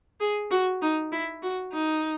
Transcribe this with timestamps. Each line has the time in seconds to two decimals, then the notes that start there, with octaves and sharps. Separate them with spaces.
0.20 G#4
0.51 F#4
0.82 D#4
1.12 E4
1.43 F#4
1.73 D#4